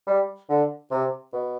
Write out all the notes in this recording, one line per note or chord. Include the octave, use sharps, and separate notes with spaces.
G3
D3
C3
B2